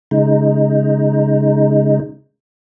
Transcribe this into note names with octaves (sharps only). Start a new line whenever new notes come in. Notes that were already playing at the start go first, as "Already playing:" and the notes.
C#3 G#3 D#4